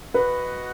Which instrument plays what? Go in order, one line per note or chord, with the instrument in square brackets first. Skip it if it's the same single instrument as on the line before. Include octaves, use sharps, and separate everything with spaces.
[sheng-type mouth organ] F#4 D#5 F#5 [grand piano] B4